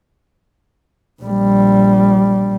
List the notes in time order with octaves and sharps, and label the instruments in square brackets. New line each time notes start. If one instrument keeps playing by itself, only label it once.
[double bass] A#1 G3